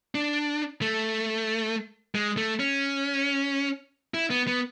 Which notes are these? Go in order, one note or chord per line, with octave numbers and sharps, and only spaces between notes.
D4
A3
G#3
A3
C#4
E4
B3
B3